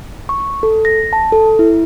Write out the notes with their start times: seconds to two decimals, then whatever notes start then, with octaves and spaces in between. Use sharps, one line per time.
0.29 C#6
0.63 A4
0.85 A#6
1.13 A5
1.32 A4
1.59 E4